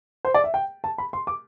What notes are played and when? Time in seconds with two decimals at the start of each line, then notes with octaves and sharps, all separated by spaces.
0.25 C5
0.34 D5
0.44 E5
0.54 G5
0.84 A5
0.98 B5
1.13 C6
1.27 D6